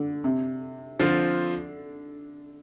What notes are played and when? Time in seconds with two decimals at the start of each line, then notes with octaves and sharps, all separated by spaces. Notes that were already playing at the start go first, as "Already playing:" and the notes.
Already playing: D3
0.24 C3
0.99 D3 F3 C4 F4